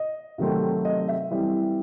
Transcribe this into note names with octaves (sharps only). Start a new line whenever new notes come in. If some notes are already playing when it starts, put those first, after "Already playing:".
Already playing: D#5
C3 D#3 F#3 A3 C4
D#5
E5
E3 G3 C4